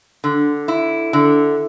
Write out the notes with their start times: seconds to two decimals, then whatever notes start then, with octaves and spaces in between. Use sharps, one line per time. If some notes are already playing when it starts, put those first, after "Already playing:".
0.24 D3
0.68 E4
1.13 D3